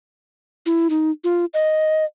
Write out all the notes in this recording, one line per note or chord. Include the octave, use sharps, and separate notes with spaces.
E4
D#4
F4
D#5